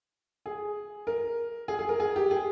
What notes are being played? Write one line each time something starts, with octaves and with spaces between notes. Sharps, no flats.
G#4
A#4
G#4
G#4
A#4
G#4
G4
G#4